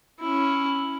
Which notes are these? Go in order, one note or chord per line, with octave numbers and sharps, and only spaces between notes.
C#4 E4